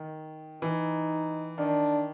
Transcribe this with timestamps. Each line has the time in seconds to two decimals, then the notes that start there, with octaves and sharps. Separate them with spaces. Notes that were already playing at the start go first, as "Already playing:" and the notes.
Already playing: D#3
0.62 E3 D#4
1.58 D#3 D4